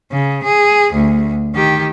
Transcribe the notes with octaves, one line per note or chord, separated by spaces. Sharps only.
C#3
G#4
D2
D#3 G4